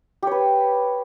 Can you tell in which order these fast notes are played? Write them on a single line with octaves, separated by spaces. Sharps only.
G4 C#5 B4